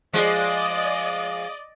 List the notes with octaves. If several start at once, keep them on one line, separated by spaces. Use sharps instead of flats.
F3 G#3 D5 D#5